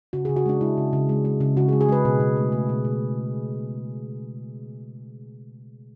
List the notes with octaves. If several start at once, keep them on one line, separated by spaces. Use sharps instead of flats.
C#3 F#4
G#4
C#3
F#4
G#3 D4
G#3 E4
C#3
C#3
G#3
G#3
C#3
C#3 F#4
G#4
G#3
G#4
G#3 B4
B2
B2
A3
A3
B2
B2